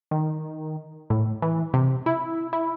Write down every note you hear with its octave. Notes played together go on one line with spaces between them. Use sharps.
D#3
A2
E3
C3
E4
E4